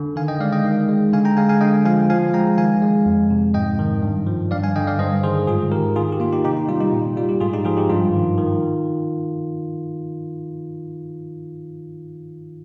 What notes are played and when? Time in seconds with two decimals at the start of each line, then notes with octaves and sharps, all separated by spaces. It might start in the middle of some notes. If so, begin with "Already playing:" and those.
Already playing: D3
0.16 D#3 F5 G#5
0.28 D#5 G5
0.40 G#3 D5 F5
0.52 D#5 G5
0.64 D#3
0.89 G#3
1.13 D3 F5 G#5
1.25 G5 A#5
1.37 G#3 F5 G#5
1.49 F5 G#5
1.61 D3 D#5 G5
1.85 F3 F5 G#5
2.10 F3 F5 G#5
2.34 G#3 G5 A#5
2.58 D#3 F5 G#5
2.82 G#3
3.06 F2
3.30 C3
3.54 G#2 D#5 G5
3.79 D#3
4.02 G2
4.27 F3
4.51 G2 D5 F5
4.64 F5 G#5
4.76 D3 D#5 G5
4.87 D5 F5
4.99 G2 C5 D#5
5.23 D#3 G#4 C5
5.47 G#2 F4 G#4
5.72 D#3 G4 A#4
5.96 D#3 F4 G#4
6.12 G4
6.20 A#3 F4
6.33 D#4 G4
6.44 C3 D#4 G4
6.57 D#4
6.69 G3 F4
6.80 D#4 G4
6.93 A#2
7.17 G3 F4
7.29 G4
7.41 G#2 F4 G#4
7.53 D#4 G4
7.65 F3 F4 G#4
7.77 D#4 G4
7.90 G2 F4
8.14 D#3
8.38 D#3